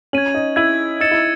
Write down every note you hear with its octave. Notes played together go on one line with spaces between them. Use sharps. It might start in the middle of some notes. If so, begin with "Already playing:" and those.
C#4 G#6 D#7 F#7
D#4
E4 G#6 D#7 F#7
D#4 E6 A6 C#7 E7
E4